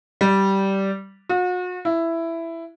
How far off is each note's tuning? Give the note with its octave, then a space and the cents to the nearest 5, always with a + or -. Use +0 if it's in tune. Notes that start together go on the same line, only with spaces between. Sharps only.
G3 -10
F#4 -40
E4 +10